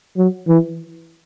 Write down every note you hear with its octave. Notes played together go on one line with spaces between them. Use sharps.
F#3
E3